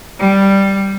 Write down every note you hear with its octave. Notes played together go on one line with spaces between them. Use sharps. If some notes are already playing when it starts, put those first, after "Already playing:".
G3